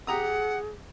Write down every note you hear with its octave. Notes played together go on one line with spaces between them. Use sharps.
G4 G#4 F#5 A#5 D#6